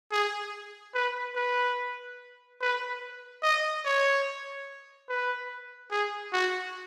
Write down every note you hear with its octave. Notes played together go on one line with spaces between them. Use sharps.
G#4
B4
B4
B4
D#5
C#5
B4
G#4
F#4